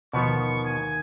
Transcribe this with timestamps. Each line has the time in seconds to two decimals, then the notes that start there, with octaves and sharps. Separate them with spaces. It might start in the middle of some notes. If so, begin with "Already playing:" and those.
0.13 D#2 B2 D#3 F3 B3 F#4 C#6
0.65 G#5